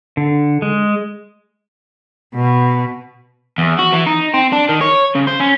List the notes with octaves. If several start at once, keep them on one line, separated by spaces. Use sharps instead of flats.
D3
G#3
B2
E2
F#4
E3
D#4
C4
D4
D#3
C#5
C#3
C5
C#4